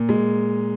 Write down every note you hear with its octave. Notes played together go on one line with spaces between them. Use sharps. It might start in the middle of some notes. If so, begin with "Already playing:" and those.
Already playing: A#2
G#3